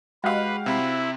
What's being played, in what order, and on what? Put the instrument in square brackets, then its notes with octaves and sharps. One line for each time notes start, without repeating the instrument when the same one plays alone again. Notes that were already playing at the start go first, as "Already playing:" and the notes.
[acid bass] G#3 [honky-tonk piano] F#4 G4 F5 [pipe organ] B4
[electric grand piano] C3 C4 B5 [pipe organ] E4